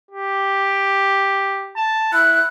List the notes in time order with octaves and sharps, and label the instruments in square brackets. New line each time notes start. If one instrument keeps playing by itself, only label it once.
[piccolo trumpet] G4
A5
[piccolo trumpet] E4 [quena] F#6